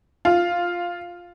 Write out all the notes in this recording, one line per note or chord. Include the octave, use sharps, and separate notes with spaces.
F4